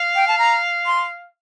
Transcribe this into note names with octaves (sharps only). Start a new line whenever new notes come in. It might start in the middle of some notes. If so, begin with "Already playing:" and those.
Already playing: F5
G5
A5
A#5
C6